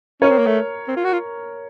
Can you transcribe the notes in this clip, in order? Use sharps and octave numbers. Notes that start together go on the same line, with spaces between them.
C#4 A#4 C#5
C4
A#3
A3
C4
F4
F#4
F4